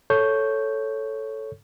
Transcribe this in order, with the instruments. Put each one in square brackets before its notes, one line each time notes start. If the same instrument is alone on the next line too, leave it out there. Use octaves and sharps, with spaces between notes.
[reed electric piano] A4 C#5 C#6 G6